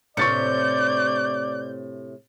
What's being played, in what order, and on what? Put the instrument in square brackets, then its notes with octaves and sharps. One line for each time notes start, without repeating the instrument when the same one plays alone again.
[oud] A2 C3 D4 [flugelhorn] D5 [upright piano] C#6 A6 C#7 [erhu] G6